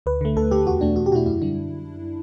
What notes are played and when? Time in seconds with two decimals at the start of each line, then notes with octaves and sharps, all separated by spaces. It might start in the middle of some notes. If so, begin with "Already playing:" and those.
0.06 D2 B4
0.21 D3 A3
0.36 D2 A4
0.51 D3 A3 G4
0.66 E2 F#4
0.81 B2 A3 D4
0.96 E2 F#4
1.06 G4
1.12 B2 F#4
1.15 A3 E4
1.26 F#2 E4
1.41 D3 G3 D4